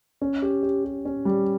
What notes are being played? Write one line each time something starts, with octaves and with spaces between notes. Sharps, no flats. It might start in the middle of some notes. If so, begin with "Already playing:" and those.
C#4
G4
G4
G4
C#4
G3